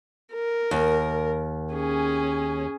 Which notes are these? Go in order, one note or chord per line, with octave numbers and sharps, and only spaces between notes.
A#4
D#2
C#4 G#4